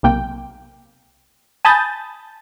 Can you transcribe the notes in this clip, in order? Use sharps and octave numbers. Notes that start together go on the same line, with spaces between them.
B1 C3 A#3 G5
G#5 A5 B5 D#6 G6 A6